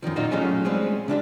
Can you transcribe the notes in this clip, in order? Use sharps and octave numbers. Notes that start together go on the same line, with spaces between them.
F#2 A2 D#3 F3
A#2 D#4 F4 F#4
F#3 A3 C#4 F4 G4 G#4
G3 G#3 C4 C#4 G#4
C#3 D4 E4 G4